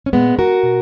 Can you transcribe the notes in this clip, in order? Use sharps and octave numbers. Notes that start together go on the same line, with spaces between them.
C#4
A#2 G#3 B3
F#4 A#4
B2